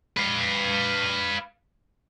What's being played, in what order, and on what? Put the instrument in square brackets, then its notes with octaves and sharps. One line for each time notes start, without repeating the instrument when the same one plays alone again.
[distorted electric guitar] B4 F5